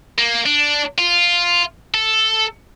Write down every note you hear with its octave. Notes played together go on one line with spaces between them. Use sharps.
A#3
D4
F4
A4